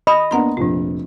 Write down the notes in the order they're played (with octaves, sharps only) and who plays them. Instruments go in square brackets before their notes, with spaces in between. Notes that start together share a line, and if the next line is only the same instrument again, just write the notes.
[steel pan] D#5 [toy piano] B5
[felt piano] A#3 B3 D4 [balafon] F#5 A#5 C6
[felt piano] F1 A#1 [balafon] F3 F4